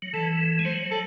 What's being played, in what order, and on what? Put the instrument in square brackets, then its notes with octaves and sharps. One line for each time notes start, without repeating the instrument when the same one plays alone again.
[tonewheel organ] F#3
[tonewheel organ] E3 [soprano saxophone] A4
[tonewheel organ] G#3
[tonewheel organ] F#3 [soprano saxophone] C5
[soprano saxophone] A4